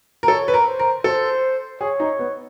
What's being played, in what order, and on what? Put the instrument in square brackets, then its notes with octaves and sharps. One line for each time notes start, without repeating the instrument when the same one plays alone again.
[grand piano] A#4
[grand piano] A4 [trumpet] C#5
[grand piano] B4
A#4
[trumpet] C5
[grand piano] A#4
[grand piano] A4 [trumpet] C5
[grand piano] G#4 [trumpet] C#5
[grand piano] D#4
B3